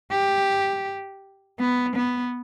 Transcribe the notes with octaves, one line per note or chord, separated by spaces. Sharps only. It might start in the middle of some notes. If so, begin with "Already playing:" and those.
G4
B3
B3